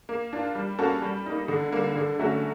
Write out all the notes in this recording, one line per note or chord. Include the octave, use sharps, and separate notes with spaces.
A#3
D4 F4
G3
A#3 C#4 F#4 A4
G3
A#3 D#4
D3
G3 A#3
D3
F#3 A3 C#4 F#4